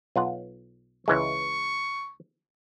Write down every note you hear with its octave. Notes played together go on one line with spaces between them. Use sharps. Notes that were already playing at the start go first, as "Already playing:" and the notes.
B1 F4 F#5
C#2 E3 G#3 C#6